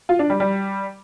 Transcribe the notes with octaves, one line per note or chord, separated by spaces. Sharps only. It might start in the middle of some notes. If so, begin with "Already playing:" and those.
F4
D4
G3
G3